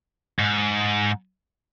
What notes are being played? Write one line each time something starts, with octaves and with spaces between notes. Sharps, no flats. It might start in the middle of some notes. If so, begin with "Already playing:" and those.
G#2